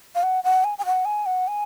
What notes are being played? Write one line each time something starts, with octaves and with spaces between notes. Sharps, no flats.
F5
F#5
F#5
G#5
G#5
F#5
G#5
F#5
G#5